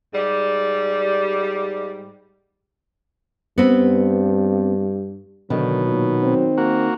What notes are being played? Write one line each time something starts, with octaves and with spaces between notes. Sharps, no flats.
G#2 G3
G2 B3 C4
B2 D3 D#3 F#3
A#2
C4
A#3 F#4